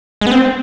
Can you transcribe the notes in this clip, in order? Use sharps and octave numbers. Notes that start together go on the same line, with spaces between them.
G#3
B3
C4